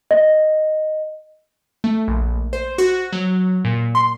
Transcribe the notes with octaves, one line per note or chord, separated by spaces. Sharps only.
D#5
A3
A#1
C5
F#4
F#3
A#2
C6